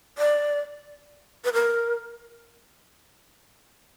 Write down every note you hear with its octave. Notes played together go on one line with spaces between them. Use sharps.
D5
B4
A#4